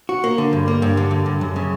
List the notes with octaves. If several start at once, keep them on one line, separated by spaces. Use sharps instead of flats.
F#4
A#3
D3
G2
A#3
G2
D3
G2
G2
F#2
C#3